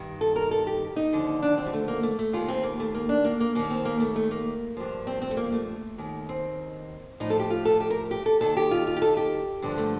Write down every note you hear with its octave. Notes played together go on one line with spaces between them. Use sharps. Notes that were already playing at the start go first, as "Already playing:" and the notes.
Already playing: G2 D#3
A4
A#4
A4
G4
D#4
D#2 D3 F3
D4
C4
G3
A3
A#3
A3
A3
D#2 D#3 F4
C4
A#3
A3
A#3
D4
A#3
A#3
D#2 D#3 A#3
C4
A#3
A3
A3
A#3
G2 F3
C4
C4
A3
A#3
A3
D#2 D#3
C4
A2 F3 D#4
A4
G4
F4
A4
G4
A#4
G4
A4
D#2 D#3 A4
G4
F4
F4
G4
A4
G4
G2 D3 F3
A3